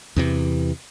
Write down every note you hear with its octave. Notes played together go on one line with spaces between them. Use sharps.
E2 C3 E3